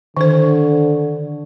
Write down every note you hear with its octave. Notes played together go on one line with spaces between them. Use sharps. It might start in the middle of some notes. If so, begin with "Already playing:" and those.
D3 D#3 C5